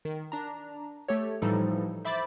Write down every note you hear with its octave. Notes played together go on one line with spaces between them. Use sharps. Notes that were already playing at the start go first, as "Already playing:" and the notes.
D#3
D4 A#5
A3 G4 A4 C#5
A2 E3 F3 G3 D#4 A4
C5 E5 B5 D6 A6